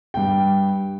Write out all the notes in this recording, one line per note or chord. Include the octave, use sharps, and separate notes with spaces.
G2 G5